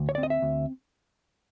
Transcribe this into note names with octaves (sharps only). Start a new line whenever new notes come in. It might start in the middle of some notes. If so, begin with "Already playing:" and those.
Already playing: D2
C#5
D5
C4
D#5
E5
D2